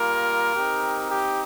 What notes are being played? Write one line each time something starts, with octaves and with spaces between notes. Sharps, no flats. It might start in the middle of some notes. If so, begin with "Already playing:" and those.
Already playing: G3 A#3 F4 A#4
C4 D#4 G4
G4